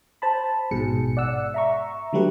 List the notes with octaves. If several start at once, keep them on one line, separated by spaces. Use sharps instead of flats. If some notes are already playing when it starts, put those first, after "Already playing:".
C5 A5 B5
A1 G#2 B2 G#4 C#7
D5 F#5 E6
E5 A#5 C#6
D3 F#3 G3 A3 G4 B4